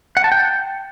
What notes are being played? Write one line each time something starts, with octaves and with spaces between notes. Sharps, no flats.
F#5
A5
G5